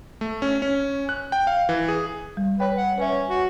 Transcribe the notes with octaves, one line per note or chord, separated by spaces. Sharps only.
A3
C#4
C#4
F#6
G5
F5
E3
G#4
G3
B4 C#5 G5
F#5
C#4 B4 C#5 E5
F#4